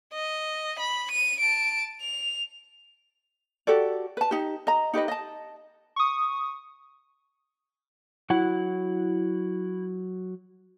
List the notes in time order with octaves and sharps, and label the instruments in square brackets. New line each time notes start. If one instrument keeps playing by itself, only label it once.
[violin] D#5
B5
D#7
A5 D7
F7
[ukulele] F#4 G4 A4 D5
B4 A5
D#4 G4
D#5 A#5
D#4 G4 B4 D#5
D#5 A5
[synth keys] C#6 D#6
[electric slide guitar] F#3 F#4 F#5 [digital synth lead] E4